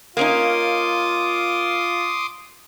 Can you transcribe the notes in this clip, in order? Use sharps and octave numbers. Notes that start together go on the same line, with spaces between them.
A#3 C#4 D#4 F4 C6 D6 D#6